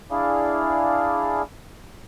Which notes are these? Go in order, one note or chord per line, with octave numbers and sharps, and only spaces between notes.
D4 E4 G#4 D5 F5